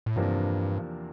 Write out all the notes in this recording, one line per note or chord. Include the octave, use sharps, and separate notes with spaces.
A2
E2 G2 C3 F3 A#3 D4